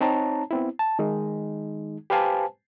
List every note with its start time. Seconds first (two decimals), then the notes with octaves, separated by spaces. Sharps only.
0.01 C4 D#4 C#5 A5 A#5
0.51 B3 C4 E4
0.79 A5
0.99 D#3 G#3 D#4
2.10 G4 B4 C5 F5 G#5 A5